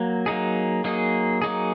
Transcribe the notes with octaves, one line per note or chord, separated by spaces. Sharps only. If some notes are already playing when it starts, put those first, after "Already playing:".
Already playing: F#3 A#3
F#3 A#3 D#4 G#4
F#3 A#3 D#4 G#4
F#3 A#3 D#4 G#4